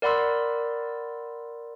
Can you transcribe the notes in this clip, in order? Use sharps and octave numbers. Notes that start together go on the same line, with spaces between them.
A#4 D5 F#5 B5 C6 E6